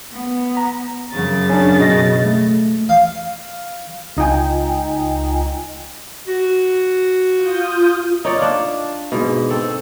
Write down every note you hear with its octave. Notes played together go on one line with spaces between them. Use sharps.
B3
A#5
F#2 C#3 A6
C#4 D4
B2 D#5 A#6
A3
F5
C#2 D#4 F4 G5 G#5
F#4
F4 D#6 G6
D#4 C#5 D5
D4 F4
G#2 B2
C4 A4